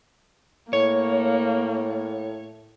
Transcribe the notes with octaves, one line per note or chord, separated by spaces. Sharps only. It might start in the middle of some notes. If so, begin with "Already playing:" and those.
A2 A#3 C#5